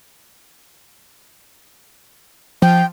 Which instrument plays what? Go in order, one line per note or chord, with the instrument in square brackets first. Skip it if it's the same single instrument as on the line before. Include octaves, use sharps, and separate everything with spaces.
[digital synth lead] F3 [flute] G5